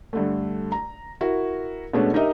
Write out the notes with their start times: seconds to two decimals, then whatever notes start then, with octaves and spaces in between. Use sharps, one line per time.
0.13 G2 D3 A3
0.72 A#5
1.21 E4 F#4 A#4
1.93 B2 G#3 A3 B3 C#4 D4
2.14 D#4 G4 A#4 D#5 E5